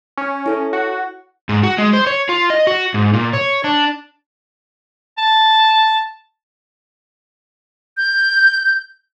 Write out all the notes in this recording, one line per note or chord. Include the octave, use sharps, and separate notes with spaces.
C#4
E4 A4 C#5
F#4
G#2
F#4
G#3
C5
C#5
F4
D#5
F#4
G#2
A#2
C#5
D4
A5
G6